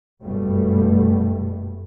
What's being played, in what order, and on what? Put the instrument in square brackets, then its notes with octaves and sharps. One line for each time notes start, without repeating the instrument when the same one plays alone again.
[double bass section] F#1 G2 B2 G3 A3